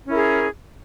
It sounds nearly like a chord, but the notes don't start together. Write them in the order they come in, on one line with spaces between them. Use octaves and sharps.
C#4 E4 A#4 G#4